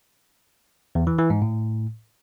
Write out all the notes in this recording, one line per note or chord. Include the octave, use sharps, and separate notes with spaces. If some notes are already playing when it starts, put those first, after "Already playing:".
E2
E3
E3
G#2
A2